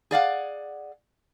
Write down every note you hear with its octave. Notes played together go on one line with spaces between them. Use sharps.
G#4 D5 F5 F#5